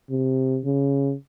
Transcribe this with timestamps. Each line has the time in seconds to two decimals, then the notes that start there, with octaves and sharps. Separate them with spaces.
0.10 C3
0.65 C#3